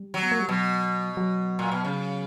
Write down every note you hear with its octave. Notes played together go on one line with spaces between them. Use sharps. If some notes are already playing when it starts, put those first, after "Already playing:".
Already playing: G3
F#3
B3
A#3
G3
B2 F#3
F#3
A#2
B2
C#3